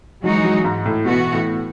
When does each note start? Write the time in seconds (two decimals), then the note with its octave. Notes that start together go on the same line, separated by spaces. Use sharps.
0.24 E3 F#3 G#3 D#4 F#4
0.45 F#3
0.64 G#2
0.86 A2
1.05 B2 E3 B3 F#4
1.32 A2